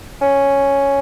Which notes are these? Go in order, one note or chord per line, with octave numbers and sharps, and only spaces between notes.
C#4